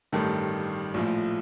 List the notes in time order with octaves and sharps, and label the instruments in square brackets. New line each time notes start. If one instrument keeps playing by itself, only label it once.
[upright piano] A1 G2 D#3 A4
A#1 A2 F3